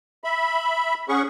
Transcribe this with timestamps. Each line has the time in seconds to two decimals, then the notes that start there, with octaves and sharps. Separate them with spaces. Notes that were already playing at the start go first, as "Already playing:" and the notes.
0.24 E5 B5
1.09 C#4 G#4 F#5 C#6